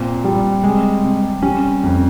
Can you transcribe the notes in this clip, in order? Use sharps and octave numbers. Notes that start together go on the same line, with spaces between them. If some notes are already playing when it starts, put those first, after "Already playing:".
Already playing: A#2 C4
G3
C3 G#3
C3
G3 C#4
F2